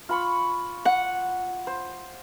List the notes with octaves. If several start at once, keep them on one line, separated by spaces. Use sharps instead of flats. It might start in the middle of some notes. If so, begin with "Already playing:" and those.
F4 B5 C#6
F#5
C5